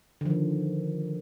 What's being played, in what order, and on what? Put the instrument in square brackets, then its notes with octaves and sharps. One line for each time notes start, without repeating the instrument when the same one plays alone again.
[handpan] D3
F3
D#3